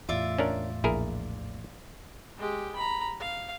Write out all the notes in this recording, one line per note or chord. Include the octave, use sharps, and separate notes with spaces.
E2 A2 F4 D5 E5
C#4 D4 A#4
A#1 E4 G#4 A#4
G#3 G4
A#5 B5
F5